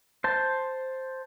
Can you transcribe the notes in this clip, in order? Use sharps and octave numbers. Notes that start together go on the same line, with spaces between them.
C5 A5